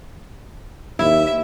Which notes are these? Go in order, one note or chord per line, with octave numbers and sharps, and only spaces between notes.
D#2 E4 E5